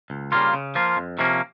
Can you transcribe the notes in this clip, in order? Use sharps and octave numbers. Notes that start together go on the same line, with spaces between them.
C#2
C#3 G3 A#3 F4
C#3
F3 A#3 F4
F2
C3 F3 A#3 C#4